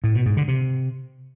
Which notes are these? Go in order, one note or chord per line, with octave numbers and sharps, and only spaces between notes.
A2
B2
G#2
D3
C3